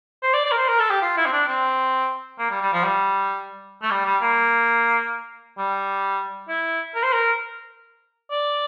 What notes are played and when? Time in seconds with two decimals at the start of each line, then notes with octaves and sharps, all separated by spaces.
0.23 C5
0.33 D5
0.45 D5
0.52 A#4
0.57 C5
0.68 A#4
0.79 A4
0.90 G4
1.02 F4
1.17 E4
1.26 C4
1.32 D4
1.48 C4
2.39 A#3
2.50 G3
2.62 G3
2.73 F3
2.84 G3
3.82 A3
3.90 G3
4.05 G3
4.21 A#3
5.58 G3
6.48 E4
6.95 A#4
7.03 C5
7.13 A#4
8.30 D5